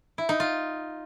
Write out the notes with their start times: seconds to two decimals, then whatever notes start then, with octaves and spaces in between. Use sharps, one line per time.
0.18 E4
0.29 D#4
0.40 F4